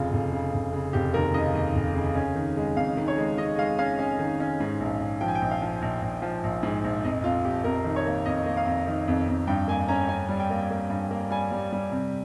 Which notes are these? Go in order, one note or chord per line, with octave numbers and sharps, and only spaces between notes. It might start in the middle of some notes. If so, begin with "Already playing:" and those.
Already playing: F1 C#3 F4
F1
C#3
F1
C#3
F1 G4
D#2 A#4
C#3 D#5
D#2
F1
C#3
C#4
D#3
G#3
F2 F5
D#3
C#5
G#3
D#3 D#5
G#3 F5
C#4 F5
C#4
D#3
C#4
G#2
A#1
A#1
F3 G5
G#5
G5
A#1
F5
F3
A#1
A#1
F3
A#1
G#2
A#1
F2 D#5
F2 F4
F2 G4
F2 A#4
D#3
C#5
A#3
F2 D#5
A#3
F5
F2
D#3
F2
F2
G2 G5
A#3 G#5
C#4 A#5
C#4 G#5
G3
G5
A#3
A#3
G2
A#3
G3 G#5
G3
G3
C3